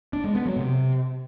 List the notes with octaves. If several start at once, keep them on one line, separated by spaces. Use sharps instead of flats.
D4
G#3
B3
F#3
C3